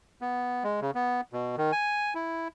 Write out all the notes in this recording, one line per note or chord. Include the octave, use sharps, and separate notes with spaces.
B3
G#3
C#3
B3
B2
D#3
G#5
E4